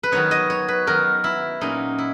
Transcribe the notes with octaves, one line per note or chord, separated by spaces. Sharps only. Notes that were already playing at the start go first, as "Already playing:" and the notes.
B4
D#3 F#3 B3 D#4 C#5
D#5
C#5
B4
D#3 F#3 B3 D#4 A#4
E4
A#2 F#3 A#3 C#4 D#4
E4